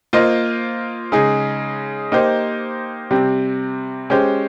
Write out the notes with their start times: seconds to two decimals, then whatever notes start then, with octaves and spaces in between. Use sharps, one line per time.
0.13 A#3 F4 C5 D#5
1.12 C#3 G#3 D#4 G#4
2.12 A#3 D#4 G4 C5 D#5
3.11 C3 G3 C4
4.10 G#3 C#4 G4 C5